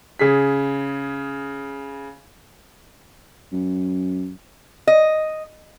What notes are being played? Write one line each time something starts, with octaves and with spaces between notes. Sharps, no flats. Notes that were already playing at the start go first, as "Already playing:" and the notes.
C#3 G#4 B6
F#2
D#5